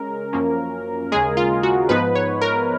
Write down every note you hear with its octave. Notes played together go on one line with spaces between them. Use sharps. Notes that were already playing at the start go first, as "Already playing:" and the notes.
Already playing: C#3 G#3 C#4 A#4
F#2 F3 A#3 C#4
D#2 C#3 G#3 G#4
F4
F#4
G#2 F3 B3 D#4 B4
C#5
A#4